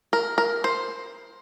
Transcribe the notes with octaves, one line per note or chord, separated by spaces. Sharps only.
A#4
A#4
C5